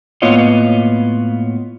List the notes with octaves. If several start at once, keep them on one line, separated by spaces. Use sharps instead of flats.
A2 A#3 B3 F4 C#5 D#5